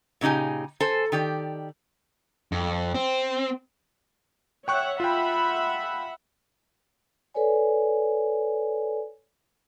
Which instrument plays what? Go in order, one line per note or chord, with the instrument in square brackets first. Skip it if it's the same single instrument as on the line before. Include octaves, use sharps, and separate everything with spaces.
[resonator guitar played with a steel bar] A#2 C#3 D#4 G4 G#5
A4 C5 G#5
D#3 G4 D5
[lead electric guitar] F2
C4
[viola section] C#5 E5 F#5 [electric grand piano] G5 C#6 F#6
[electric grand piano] F4 G5 [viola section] E5 F#5 B5
[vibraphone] A4 B4 C#5 D5 G#5